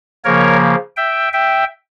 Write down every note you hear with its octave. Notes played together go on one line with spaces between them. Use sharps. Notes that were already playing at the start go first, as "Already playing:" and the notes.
C#3 F3 A#3 A#4 C#5
E5 G5
E5 G5